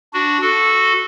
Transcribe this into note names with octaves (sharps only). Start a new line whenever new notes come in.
D4 F#4
F#4 A4